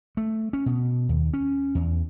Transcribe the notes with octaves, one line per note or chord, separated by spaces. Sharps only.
A3
C#4
B2
D#2
C#4
E2